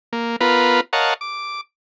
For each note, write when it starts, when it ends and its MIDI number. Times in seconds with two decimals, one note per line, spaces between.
0.13 0.36 58
0.41 0.81 59
0.41 0.81 65
0.41 0.81 70
0.41 0.81 71
0.93 1.14 70
0.93 1.14 73
0.93 1.14 75
0.93 1.14 77
0.93 1.14 78
0.93 1.14 81
1.21 1.61 86